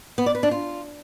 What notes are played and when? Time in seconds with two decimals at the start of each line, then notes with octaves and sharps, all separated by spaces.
0.18 B3
0.26 D5
0.35 B4
0.43 D4
0.51 F4